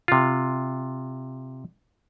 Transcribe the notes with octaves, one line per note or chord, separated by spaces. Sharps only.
C3 F4